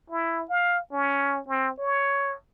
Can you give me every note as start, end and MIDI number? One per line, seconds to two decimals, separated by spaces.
0.10 0.44 64
0.49 0.79 77
0.92 1.40 61
1.48 1.71 60
1.79 2.35 73